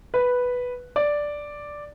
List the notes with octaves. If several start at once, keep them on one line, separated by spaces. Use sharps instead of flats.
B4
D5